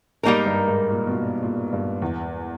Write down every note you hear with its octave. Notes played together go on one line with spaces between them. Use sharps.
G#2 G3 A#3 D#4 A#4
G2
G#2
A#2
B2
A#2
A#2
G2
E2